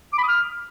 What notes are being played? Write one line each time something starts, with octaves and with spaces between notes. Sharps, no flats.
D6
B5
D#6
F6